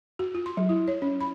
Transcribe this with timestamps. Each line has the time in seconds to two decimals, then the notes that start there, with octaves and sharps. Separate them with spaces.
0.19 F#4
0.35 F4
0.46 C6
0.57 F#3
0.69 E4
0.88 C#5
1.02 C#4
1.21 B5